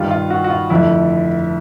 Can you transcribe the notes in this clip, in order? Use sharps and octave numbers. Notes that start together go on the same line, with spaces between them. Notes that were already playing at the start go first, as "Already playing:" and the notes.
Already playing: G2 D#3 G3 F4
F4
F#4
F#4
F4
F1 F2 D3 E4